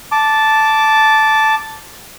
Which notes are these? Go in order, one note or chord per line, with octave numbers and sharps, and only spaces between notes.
A5 D6